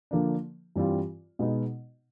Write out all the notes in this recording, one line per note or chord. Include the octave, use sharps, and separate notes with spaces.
D3 F3 A#3 D4
G2 E3 G3 C4 F4
B2 G#3 B3 D#4